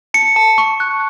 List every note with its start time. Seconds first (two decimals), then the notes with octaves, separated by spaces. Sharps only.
0.14 A5 C#7
0.36 A5
0.58 C#6
0.80 F#6